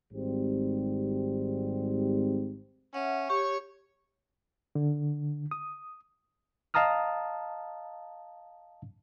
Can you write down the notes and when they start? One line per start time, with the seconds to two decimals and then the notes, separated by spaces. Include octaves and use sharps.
0.13 G#1 G#2 G3 C4 G4
2.94 C#4 E5 F#5
3.30 G4 C#5 C#6
4.75 D3
5.51 D#6
6.74 D#5 F5 A5 A#5 D#6 F6